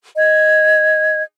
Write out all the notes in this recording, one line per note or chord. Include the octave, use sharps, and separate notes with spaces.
D#5 G#6